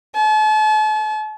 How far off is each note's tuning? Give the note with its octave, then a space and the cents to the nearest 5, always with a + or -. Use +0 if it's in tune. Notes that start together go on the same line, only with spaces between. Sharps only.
A5 -40